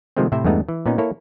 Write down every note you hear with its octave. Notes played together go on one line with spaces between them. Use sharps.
C3 D#3 F3 G#3 A3 C4
A2 C3 C4 E4 C5 E5
E2 G2 G#3 A3 B3 D#4
E3
A#2 B3 C#4 D#4
A#3 E4 A4 C#5